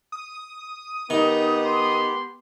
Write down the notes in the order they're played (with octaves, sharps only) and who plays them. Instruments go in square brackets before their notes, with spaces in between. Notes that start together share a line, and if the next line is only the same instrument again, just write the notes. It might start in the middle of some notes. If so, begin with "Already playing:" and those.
[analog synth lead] D#6
[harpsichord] D#3 [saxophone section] B3 G4 [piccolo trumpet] D#4
[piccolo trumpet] C6